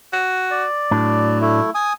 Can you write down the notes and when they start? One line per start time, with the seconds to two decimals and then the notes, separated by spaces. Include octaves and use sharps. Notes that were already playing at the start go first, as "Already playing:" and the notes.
0.13 F#4
0.51 D5
0.91 A2 F#3 D4
1.41 A3 E4
1.75 G#5 D#6